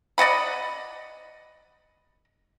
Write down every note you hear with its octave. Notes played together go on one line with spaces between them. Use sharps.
D5 D#5 F#5 B5